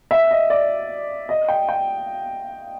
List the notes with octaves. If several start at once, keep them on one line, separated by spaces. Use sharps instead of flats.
E5
D#5
D5
D#5
G5
G5